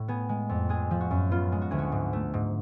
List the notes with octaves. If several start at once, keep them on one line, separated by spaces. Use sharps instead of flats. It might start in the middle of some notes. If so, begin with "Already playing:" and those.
Already playing: A2
B3 G#4
G#3
F2
G#3 G#4
F3
F#4
F#2
B3 F4
G#3
F#4
D2 G#4
F#4
G#2
A3
G#2